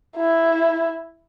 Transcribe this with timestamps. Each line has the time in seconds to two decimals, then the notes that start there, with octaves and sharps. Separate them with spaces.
0.17 E4